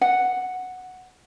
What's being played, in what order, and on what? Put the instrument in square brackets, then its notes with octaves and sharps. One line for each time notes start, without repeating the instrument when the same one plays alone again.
[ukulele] F#5